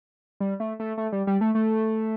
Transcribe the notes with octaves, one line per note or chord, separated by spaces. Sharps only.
G3
A3
A3
A3
G3
G3
A3
A3